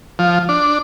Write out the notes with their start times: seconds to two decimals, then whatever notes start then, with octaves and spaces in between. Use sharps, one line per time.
0.19 F3
0.49 D4